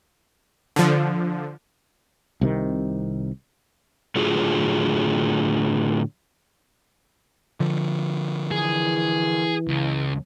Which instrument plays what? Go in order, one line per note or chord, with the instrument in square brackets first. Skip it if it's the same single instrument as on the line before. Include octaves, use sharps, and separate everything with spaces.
[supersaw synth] D3 F3
[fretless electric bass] C2 C3 D#3
[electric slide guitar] A2 D3 F#3 F4 G#4
[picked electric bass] D3 F3
[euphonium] E3 [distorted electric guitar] G#4
[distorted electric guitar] C#2